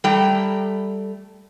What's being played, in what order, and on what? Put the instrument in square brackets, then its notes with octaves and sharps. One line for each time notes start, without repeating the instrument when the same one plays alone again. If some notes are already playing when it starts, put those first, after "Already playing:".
[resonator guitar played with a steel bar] G3 A3 G5 A#5